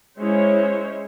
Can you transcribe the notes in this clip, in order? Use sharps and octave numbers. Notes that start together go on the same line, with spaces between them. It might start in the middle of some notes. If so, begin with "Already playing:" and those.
G#3 C#4 E4 C5 C#5